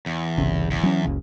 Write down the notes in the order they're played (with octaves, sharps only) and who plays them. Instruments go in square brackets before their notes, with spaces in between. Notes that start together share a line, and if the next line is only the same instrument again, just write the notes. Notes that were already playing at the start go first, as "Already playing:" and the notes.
[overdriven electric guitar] E2
[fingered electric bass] G1 C2 C#3
[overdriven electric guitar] E2
[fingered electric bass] F#3 C#4
F#1 C#2 C#3